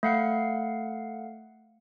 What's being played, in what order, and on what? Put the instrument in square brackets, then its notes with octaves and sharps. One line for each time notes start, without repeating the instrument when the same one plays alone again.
[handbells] A3 F5 F#5 C7